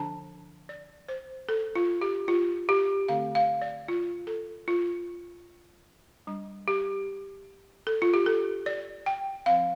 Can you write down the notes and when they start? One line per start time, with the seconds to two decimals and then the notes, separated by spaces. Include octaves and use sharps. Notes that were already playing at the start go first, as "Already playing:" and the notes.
Already playing: D3 F3 D4 A5
0.69 D5
1.09 C5
1.49 A4
1.75 F4
2.02 G4
2.28 F4
2.69 G4
3.08 D3 A3 C4 F5
3.35 F5
3.62 D5
3.88 F4
4.27 A4
4.68 F4
6.27 G3 D4
6.68 G4
7.87 A4
8.02 F4
8.14 G4
8.26 A4
8.66 D5
9.06 G5
9.46 F3 C4 F5